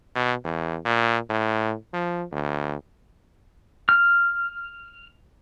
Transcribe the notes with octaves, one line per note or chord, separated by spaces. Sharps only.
B2
E2
A#2
A2
F3
D2
F6